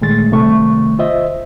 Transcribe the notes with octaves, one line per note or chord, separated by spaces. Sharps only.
A#2 D#3 G#3 A3 A6
C3 D#3 G3 A3 C4 C#6
F4 C5 D#5 E5